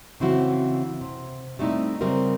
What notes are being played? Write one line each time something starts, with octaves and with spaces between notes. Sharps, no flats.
C#3 E3 C4 C#4 E4 F#4
C3
G3 A3 C4 D#4 E4
C#3 G3 C4 G4 A#4 E5